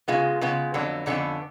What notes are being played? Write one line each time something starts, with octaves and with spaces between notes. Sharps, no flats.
C#3 G#3 B3 F4
C#3 G#3 B3
F2 D3 F#3 B3
F2 D3 F#3 B3 C#4